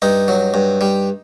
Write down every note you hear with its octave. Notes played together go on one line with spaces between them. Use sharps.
G2 D#4
F#3
G2
G3